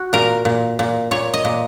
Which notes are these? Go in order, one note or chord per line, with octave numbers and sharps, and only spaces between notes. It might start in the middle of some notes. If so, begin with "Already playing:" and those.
Already playing: F#4
A#2 A#4
A#2
A#2
A#2 C#5
D#5
A#2